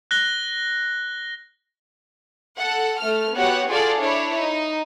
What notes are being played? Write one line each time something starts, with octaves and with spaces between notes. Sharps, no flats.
F#6 A#6 G7
A4 F#5
A3 F6
B3 F#4 G4 C#5 F#5
F4 F#4 G#4 A4 D5 F5
D4 E4 C#5
D#4